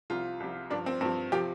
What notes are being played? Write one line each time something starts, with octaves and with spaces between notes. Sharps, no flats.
C2 C3 F3 F4
C2 C3 F3
G2 F3 D4
C4
G2 F3 C4
C3 F3 G4